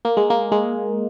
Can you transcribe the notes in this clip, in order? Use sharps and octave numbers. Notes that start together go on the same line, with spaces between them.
A#3
G#3
A#3
G#3